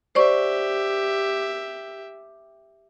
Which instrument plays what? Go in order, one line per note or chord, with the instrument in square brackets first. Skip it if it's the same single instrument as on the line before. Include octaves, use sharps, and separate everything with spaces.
[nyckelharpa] G4 E5 [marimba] C5 D5 C#6